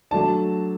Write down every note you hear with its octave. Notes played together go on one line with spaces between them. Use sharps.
F#3 A3 D4 A5